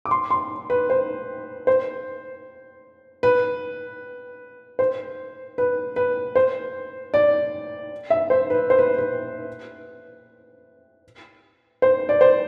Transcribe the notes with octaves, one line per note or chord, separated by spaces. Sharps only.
D6
C6
C6
B4
C5
C5
B4
C5
B4
B4
C5
D5
E5
C5
B4
C5
B4
B4
C5
D5
C5